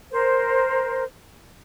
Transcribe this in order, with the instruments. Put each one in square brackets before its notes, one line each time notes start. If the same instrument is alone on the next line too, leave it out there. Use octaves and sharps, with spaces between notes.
[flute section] A#4 C5